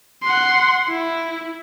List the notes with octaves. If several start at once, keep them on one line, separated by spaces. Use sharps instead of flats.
F#5 C6
E4